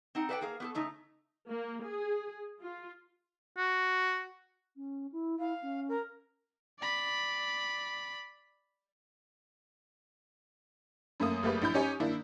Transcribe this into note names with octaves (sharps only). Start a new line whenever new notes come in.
C4 D#4 F#5
A4 B4 D5 E5 F#5 G5
A#3 G#4 A#4 F5
B3 G4 A4
C#3 A3 D#4
A#3
G#4
F4
F#4
C#4
E4
E4 F5
C#4
A#4
D5 B5
F#2 A3 A#3 D#6
F#1 A3 A#3 G4 B4
A#1 E4 B5 G6
C#4 D#4 G4 C#5 G#5
D#3 A#3 D4 E4